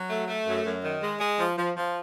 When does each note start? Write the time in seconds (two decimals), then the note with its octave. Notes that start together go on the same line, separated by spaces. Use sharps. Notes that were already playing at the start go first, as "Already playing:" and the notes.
Already playing: F#3
0.10 A3
0.28 A3
0.46 F#2
0.65 F#2
0.84 D#3
1.02 G#3
1.20 G#3
1.38 F3
1.57 F3
1.76 F3